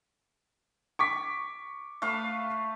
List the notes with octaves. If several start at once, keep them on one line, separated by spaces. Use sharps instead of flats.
C#6 D6 B6
A3 B4 F5